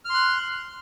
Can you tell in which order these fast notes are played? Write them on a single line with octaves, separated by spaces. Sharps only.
F6 C6 F#6